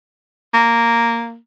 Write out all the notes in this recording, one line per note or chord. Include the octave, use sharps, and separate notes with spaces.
A#3